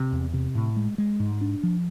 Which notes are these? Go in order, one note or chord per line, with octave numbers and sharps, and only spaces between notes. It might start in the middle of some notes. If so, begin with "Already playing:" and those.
Already playing: C3
E2
C3
A2
G#3
G#3
G#2
D4
F3